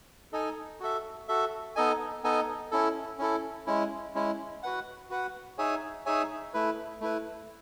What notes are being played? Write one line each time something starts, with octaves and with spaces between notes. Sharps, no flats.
D#4 A4 D#5 G#5
F#4 A4 E5
F#4 A4 E5
B3 D#4 A4 D#5 G#5
B3 D#4 A4 D#5 G#5
C#4 E4 A4
C#4 E4 A4
G#3 C#4 E4
G#3 C#4 E4
F#4 B4 F#5
F#4 B4 F#5
D#4 G#4 C#5 E5 G#5
D#4 G#4 C#5 E5 G#5
A3 E4 B4
A3 E4 B4